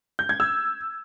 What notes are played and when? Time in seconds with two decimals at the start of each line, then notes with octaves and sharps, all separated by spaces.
0.19 G6
0.29 G#6
0.40 E6